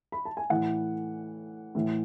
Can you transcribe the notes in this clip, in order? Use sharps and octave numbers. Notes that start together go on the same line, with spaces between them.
B5
A5
G#5
A2 E3 F#5
A2 E3